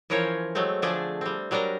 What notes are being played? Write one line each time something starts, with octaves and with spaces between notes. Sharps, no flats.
E3 F3 C#4 A#4 C5 C#5
F#3 G#3 A3 C4
D3 F3 A3 D4 G#4 D5
G3 C4
F#3 G3 D4 A#4 A#5